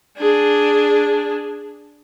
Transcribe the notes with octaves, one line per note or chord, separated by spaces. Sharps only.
D4 G#4